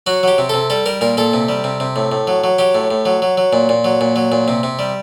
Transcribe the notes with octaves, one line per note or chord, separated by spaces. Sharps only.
F#3 F#4
F#3 G4
C3
C3 A4
G3 A4
G3 A#4
A#2 A#4
A#2 A4
C3
G3
C3
C3
A2
A2
F#3
F#3
F#3 G4
A2
A2
F#3
F#3
F#3
A#2
A#2
F#3
A#2
F#3
A#2
C3
C3
G3